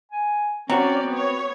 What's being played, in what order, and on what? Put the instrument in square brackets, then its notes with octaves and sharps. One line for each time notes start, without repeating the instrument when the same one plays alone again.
[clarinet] G#5
[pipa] F#3 [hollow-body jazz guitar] C4 F#4 [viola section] C#4 D5 [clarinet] G5
[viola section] B3 C#5